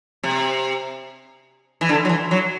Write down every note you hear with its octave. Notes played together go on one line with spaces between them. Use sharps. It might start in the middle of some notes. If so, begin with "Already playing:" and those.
C3
E3
D3
F#3
E3
F#3